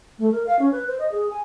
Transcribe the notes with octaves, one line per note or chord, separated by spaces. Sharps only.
A3
A#4
F5
C#4
B4
C5
D#5
G#4
G#5